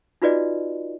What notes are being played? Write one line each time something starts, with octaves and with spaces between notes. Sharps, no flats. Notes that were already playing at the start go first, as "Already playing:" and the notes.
D#4 F4 F#4 B4 D5 D#5